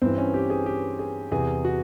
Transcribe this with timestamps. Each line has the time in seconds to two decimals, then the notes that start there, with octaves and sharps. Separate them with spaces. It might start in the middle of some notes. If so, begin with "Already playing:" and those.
0.02 G2 E3 C4
0.18 C#4
0.34 G4
0.50 G#4
0.66 G4
0.99 G#4
1.31 E2 C3 E3 G#4
1.65 F#4